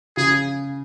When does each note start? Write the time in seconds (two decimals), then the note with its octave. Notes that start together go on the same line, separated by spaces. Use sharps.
0.17 C#3 G#4